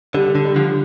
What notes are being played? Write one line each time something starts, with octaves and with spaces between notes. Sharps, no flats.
D3 G3
D3
G3
D3 F3